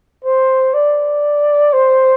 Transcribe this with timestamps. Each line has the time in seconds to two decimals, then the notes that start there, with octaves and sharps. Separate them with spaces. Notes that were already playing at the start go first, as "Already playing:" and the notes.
0.24 C5
0.74 D5
1.73 C5